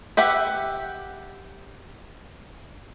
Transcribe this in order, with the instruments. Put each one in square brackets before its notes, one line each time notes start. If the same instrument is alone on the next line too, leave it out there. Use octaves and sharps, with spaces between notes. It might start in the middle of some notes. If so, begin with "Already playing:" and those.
[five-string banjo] G4 B4 E5 F#5